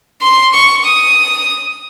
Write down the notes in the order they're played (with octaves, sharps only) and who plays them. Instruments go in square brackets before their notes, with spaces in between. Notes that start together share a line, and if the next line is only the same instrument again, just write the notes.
[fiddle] C6
C#6
D#6